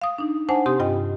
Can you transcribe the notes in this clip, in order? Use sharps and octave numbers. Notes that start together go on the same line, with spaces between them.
F5 D#6
D4 D#4
D4 C5 F#5 G#5 A5
C3 C4 G4 C6 D#6
G2 F4 D#5 G5